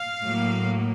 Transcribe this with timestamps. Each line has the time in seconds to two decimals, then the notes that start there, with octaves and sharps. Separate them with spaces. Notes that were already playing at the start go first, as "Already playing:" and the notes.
Already playing: F5
0.22 A2 F#3 A#3